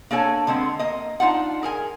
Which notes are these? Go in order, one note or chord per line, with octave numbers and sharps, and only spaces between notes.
A#3 D4 A4 C#5 G#5
D3 G#3 B3 C4
A#3 D#5
D4 D#4 F4 F#5
G#4 A#4 G#5